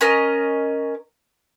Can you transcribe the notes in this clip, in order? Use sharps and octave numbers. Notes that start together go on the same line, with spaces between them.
C#4 A#4 D#5